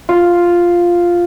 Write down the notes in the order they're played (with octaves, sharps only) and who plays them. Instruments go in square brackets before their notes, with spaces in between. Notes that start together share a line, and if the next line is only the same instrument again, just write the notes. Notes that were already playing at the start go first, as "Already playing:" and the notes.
[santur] F4